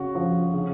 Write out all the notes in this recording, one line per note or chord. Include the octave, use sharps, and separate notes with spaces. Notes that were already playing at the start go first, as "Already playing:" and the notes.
Already playing: C#3 F#4
F3
C#3